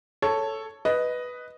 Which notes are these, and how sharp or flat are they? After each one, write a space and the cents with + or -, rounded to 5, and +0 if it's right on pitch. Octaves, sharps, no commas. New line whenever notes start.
A4 +5 C#5 +0
B4 +0 D#5 +0